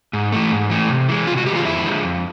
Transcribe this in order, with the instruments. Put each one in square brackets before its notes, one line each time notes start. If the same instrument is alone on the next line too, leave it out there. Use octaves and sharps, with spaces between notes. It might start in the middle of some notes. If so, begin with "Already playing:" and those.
[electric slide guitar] G#2
E3 A3
G#2
E3 A3
C3
E3 G#3
C3 F4
F#4
E3 G#3 G4
F4
F2 E4
D3 F3 G#3
F2